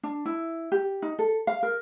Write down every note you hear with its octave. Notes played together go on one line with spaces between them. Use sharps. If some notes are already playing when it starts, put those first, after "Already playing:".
D4
E4
G4
D#4
A4
F5
A#4